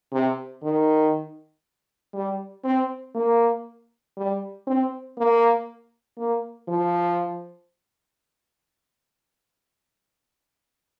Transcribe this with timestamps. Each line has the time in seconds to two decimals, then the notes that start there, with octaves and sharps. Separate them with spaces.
0.12 C3
0.63 D#3
2.14 G3
2.64 C4
3.15 A#3
4.17 G3
4.67 C4
5.17 A#3
6.18 A#3
6.68 F3